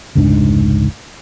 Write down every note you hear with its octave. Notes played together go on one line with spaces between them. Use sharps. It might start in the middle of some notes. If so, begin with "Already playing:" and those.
F1 C#2 G#2 D4